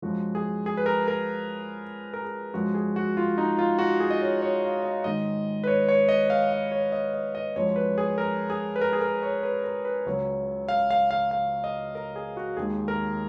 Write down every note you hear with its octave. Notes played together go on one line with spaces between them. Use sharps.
F#2 F3 G#3 F#4
G#4
G#4
B4
A#4
A#4
A#4
G#4
F#2 F3 G#3 F#4
G#4
F#4
F4
D#4
F4
F#4
G#4
D#5
C#5
C#5
F5
D#5
G#2 D#3 G#3 D#5
B4
C#5
C#5
D#5
F5
F5
C#5
D#5
D#5
D#5
F#2 F3 G#3 C#5
B4
G#4
A#4
G#4
B4
A#4
G#4
A#4
C#5
B4
A#4
B4
C#2 C#3 F#3 C#5
F5
F5
F5
F5
D#5
A#4
G#4
F#4
D#2 D#3 G#3 G#4
A#4